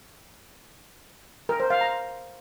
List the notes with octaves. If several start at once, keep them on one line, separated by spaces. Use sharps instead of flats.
A#4
C5
F5
A#5